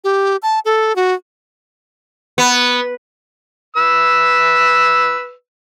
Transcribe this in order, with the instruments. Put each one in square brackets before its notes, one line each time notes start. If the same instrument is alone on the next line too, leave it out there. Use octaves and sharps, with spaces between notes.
[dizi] G4
A5
A4
F#4
[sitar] B3
[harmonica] B4 E6